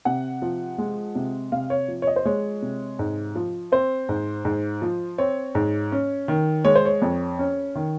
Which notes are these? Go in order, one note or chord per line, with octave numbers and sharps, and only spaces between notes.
C3 F#5
F3
G#3
C3
C3 F5
C#5
F3
C#5
D#5
C5
G#3 C#5
C3
G#2
F3
C4 C5
G#2
G#2
F3
C4 C#5
G#2
C#4
D#3
G#3 C#5
C5
C#5
F2
C#4
D#3